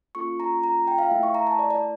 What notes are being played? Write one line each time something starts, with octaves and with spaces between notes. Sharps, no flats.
A#3 C#4 F4 A4 C#6
A#5
A#5
G5
F5
A3 E4 A4 E5
C#6
A#5
A5
D5
D5